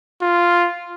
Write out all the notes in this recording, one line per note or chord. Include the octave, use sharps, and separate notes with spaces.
F4